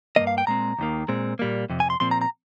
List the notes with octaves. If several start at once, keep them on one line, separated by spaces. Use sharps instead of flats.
G2 D#3 A#3 D#5
F5
G5
A#2 G#3 C4 A#5
D#2 D#3 A#3
A#2 G#3 C4
A#2 G3 A#3
F2 C3
G#5
C6
A#2 F3 C4 C6
A#5
A#5